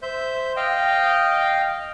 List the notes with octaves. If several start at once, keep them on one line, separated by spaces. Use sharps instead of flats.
C5 E5 G6
D#5 F5 G5